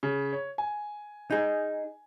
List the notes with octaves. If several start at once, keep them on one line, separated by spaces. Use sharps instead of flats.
C#3
C#5
G#5
D#4 G#4